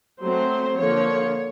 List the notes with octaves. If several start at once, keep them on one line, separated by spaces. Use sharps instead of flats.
F#3 A3 C4 C5
D3 F3 A#3 C#5